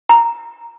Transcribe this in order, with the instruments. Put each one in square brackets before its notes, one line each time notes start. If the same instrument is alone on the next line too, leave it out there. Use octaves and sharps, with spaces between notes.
[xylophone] A#5